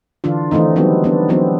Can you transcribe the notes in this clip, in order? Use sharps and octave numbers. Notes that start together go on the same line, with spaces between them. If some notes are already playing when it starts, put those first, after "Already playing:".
D3 E3 D4 F4
D#3 E3 A3 C4 D#4
F#3 G3 B3 C4
B3 D4
E3 F#3 B3 C4